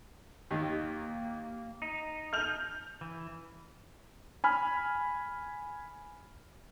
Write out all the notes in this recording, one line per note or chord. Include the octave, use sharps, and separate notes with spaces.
D#2 D#3 A#3
D#4
F6 G6 F7
E3
G#5 B5 F6